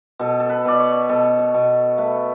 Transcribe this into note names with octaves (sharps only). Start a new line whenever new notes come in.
B2 A4
A4
B4
B2 D5
C#5
B2 A4
C#5
B2
A3 B4